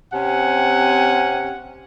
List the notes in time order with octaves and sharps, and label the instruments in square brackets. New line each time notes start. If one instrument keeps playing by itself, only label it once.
[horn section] C3 C4 C#4 G4 F#5 G#5